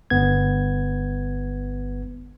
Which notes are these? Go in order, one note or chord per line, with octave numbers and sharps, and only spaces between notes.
G1 B3 G#6